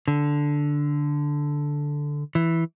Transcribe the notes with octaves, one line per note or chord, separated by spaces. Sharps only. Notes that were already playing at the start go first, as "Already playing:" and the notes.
D3
E3